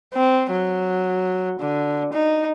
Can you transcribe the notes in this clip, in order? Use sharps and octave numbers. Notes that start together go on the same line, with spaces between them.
C4
F#3
D3
D#4